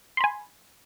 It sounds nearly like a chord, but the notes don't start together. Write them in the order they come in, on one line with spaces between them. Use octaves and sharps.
C6 B5 G#5